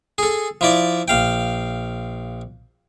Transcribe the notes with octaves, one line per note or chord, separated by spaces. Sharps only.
G#4 A4
F3 E4 D5
A#1 F5 G5